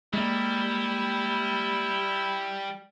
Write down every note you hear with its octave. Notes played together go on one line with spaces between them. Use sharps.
G3 G#3 A#3 E4